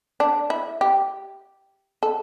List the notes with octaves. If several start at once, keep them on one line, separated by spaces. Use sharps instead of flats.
D4
E4
G4
A4